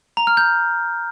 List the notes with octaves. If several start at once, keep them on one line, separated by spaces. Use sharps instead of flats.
A#5
F6
G6